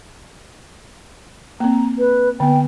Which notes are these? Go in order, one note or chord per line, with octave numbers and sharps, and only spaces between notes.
A#3 C4 A#5
B4
D3 B3 G5